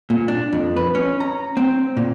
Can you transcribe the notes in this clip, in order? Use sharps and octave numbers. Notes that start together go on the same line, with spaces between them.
A#2
D4
F2
B4
C#4
A#5
C4
A#2